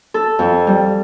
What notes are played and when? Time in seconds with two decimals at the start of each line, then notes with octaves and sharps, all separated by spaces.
0.14 A4
0.39 F2
0.67 G3